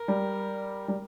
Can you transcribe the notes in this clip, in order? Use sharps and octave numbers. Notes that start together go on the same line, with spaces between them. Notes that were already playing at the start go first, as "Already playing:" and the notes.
Already playing: A#4
G3
G3